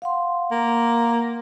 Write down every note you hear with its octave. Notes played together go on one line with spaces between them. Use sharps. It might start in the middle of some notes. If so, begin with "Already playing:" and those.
F5 F#5 C6
A#3